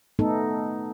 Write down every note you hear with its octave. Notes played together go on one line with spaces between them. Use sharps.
A3 B3 D#4 A4